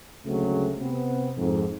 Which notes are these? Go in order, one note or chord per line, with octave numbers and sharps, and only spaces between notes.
D2 C#3 F#3 G#3 A3 C4
C3 B3 C4
F2 G#2